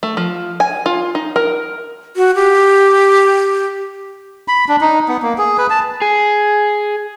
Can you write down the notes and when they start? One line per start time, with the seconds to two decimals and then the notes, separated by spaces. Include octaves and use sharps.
0.03 A3
0.17 F3
0.60 G#5
0.86 F4
1.15 D#4
1.36 A#4
2.16 F#4
2.35 G4
4.48 B5
4.69 D4
4.81 D#4
5.08 B3
5.22 A#3
5.38 G#4
5.58 B4
5.70 A5
6.02 G#4